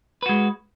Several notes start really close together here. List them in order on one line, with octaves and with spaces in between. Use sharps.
B4 F#4 G#3